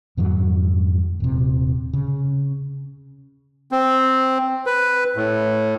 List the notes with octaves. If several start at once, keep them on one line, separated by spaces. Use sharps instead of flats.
F2 G#2 D#3 F#3
D#1 C3
C#3
C4
B4
A2